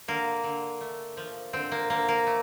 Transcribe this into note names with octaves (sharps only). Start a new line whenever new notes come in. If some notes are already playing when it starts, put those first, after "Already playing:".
D3 A#3
D3
A3
F3
D3 C4
A#3
D3 A#3
A#3
A3